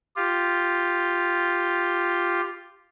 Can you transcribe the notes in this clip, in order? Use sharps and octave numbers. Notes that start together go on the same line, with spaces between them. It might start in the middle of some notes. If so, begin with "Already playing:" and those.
F4 G4